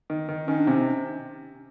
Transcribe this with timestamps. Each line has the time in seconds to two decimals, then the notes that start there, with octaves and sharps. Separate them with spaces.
0.10 D#3
0.29 D#3
0.48 D#3 C#4
0.59 D4
0.67 C3 C#4